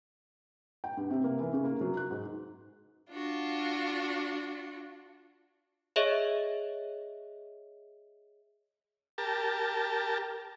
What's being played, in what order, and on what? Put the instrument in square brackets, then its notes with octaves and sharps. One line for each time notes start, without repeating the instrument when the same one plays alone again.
[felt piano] G5
G2
C3
A#3
E3
C#3
A#3
F#3
F#6
G#2
[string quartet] D4 F4 F#4
[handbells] G#4 C#5 D#5 E5
[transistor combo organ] G4 A#4 A5